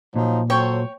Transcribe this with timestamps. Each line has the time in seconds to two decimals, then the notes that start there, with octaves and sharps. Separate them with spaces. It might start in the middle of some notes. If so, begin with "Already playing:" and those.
0.15 A#2 F3 F#3 D#4
0.50 F#3 A4 C5 C#5 G5 C#6